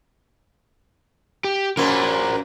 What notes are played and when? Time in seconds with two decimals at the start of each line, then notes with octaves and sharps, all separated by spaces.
1.44 G4
1.77 F#2 A#2 A#3 A#4 C5